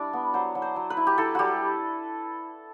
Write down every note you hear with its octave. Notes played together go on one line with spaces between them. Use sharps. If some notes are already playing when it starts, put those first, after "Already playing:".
Already playing: G3 D4 E4 D5
B3
F#3 C5
F#3
C5
F#3
B4
E4
G4
E4 A4
G3 F#4 G4